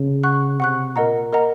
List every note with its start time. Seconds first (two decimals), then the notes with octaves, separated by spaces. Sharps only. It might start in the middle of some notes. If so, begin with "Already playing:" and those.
Already playing: C#3
0.24 F#5 C#6 F#6
0.60 C3 F#5 C#6 F#6
0.96 A#2 A#4 D#5 F#5 A#5
1.33 A#4 D#5 F#5 A#5